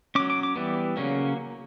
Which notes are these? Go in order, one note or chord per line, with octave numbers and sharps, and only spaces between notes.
F#3 C#4 D6
D6
D6
E3 G3 B3
C#3 F#3 A#3 C#4